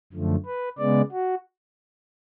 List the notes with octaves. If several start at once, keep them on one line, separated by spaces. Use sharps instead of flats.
F#2 D3 F3 A3
B4
C#3 G#3 B3 D5
F#4